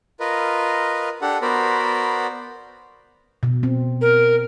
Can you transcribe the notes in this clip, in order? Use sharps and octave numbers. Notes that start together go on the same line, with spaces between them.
F4 A#4 B4 D#5
D4 G4 A4 F#5
B3 F#4 A#4 C5 D5 B5
B2
C4
A#4